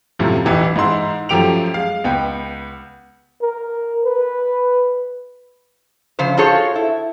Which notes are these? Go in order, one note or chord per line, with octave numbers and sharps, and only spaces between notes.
F#2 A2 C3 F3
E1 A1 E3 G4
G#2 E3 D#4 C6 E6
F#2 F3 A3 G4 D7 F7
G#3 F5
C#2 B3 G5
A#4
B4
C#3 F3 C5
F4 F#4 G#4 A4 C5 C#5
E4